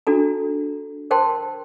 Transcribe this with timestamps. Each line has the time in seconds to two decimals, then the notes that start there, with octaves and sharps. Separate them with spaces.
0.07 D4 F#4 A4 A#5
1.11 A#4 C5 G5 A5 C6